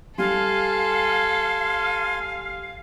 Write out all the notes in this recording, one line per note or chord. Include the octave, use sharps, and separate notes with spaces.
G3 A4 F5 G#5 C6